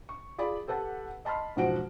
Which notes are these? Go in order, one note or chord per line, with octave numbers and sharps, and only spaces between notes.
C#6
F4 G#4 D5 B5
G4 A4 B4 F#5 A5
D#5 A5 B5 C6 F6
E1 G#2 F3 F#4 F#5 D7